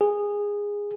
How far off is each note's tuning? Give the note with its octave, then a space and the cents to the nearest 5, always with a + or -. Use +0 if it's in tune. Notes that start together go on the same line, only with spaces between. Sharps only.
G#4 -15